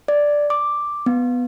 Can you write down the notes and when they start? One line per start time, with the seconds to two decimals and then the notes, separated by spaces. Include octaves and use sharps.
0.08 D5
0.50 D6
1.06 B3